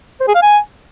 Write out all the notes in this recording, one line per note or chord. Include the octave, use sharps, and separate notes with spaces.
C5
G#4
F5
G#5